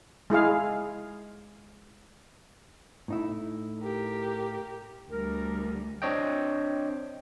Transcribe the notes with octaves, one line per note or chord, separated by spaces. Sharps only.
G#3 E4 G#4 F5
A2 D#4 E4
G4 A#4
D2 G3 A#4
C4 D4 C#5 D#5 G5